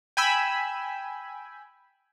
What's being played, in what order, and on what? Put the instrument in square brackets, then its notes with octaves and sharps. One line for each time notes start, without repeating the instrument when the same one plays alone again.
[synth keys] G5 G#5 B5 E6